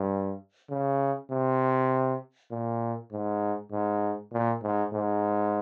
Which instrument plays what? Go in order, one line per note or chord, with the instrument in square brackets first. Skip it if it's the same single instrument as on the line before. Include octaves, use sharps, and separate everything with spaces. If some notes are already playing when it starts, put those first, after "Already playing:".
Already playing: [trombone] G2
C#3
C3
A#2
G#2
G#2
A#2
G#2
G#2